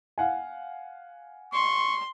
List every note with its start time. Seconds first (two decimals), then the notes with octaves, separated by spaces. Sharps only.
0.18 F5 F#5 G#5
1.53 C6 C#6